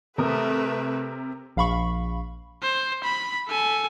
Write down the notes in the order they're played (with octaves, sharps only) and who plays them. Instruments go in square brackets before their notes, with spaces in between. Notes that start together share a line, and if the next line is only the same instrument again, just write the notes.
[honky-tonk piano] C3 A#4 D#6 [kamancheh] A3 B4
[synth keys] A#1 F5 B5 C#6
[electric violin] C5
B5
A4 G#5